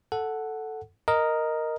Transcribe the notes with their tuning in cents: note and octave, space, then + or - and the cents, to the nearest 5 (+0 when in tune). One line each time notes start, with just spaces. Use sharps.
A4 +0 F#5 +0
A#4 +0 D#5 +0